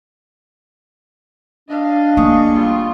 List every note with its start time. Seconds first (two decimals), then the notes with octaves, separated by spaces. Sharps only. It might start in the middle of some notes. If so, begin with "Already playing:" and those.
1.69 D4 D#5 F5
2.17 A#3 G#4 C#6
2.52 G3 F4